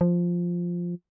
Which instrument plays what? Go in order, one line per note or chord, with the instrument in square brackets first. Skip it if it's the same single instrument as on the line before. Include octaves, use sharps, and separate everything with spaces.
[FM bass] F3